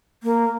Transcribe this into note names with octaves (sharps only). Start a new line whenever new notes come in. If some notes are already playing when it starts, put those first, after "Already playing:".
A#3